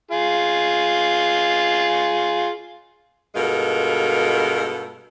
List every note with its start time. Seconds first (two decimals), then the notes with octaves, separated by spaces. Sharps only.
0.11 F4 G#4
3.35 G2 B2 G#3 F4 A4 A#4